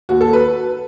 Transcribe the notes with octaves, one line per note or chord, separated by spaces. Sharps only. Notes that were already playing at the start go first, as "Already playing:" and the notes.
D#2 F#4
A4
B4